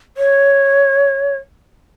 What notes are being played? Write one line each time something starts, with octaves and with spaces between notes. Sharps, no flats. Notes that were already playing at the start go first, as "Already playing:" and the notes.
C#5